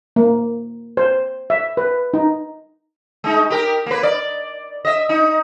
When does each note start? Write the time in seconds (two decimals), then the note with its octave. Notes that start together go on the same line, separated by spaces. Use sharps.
0.16 A#3
0.97 C5
1.50 E5
1.77 B4
2.14 D#4
3.24 G#3 D#4
3.50 G4 A#4
3.86 A#3 B4
4.03 D5
4.85 D#5 E5
5.09 D#4